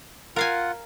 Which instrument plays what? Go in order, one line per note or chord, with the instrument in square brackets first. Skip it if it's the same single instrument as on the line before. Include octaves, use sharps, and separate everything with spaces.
[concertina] F4 F#5 [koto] A#4 F5 G#5